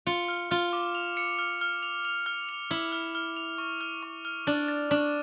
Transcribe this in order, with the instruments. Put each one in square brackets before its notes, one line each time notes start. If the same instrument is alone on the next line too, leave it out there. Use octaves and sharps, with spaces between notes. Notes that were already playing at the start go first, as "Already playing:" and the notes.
[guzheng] F4 [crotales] C#7
[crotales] F6
[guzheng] F4 [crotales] F6
[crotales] D6
F7
C#7
F6
F6
F7
F7
F6
F7
[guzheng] E4 [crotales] D6
[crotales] F6
F6
F7
C#6
F6
C#6
F6
[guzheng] D4 [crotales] A6
[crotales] A6
[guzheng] D4 [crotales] C#6